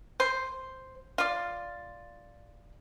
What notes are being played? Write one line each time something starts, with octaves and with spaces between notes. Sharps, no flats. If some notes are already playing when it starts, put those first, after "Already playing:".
C5
F4 D5